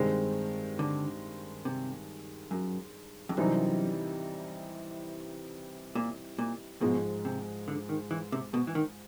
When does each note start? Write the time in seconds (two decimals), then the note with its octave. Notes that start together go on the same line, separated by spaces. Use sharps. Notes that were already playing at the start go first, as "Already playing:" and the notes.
Already playing: G2 D#3 G#3 C4
0.79 D3
1.65 C3
2.51 F#2
3.29 F2
3.37 F#2 C3 E3 G3 C4 D#4
5.95 A#2
6.39 A#2
6.81 G#2 B2 F3 G#3
7.25 C3
7.68 D3
7.89 D#3
8.11 E3
8.32 C3
8.54 B2
8.67 E3
8.75 D#3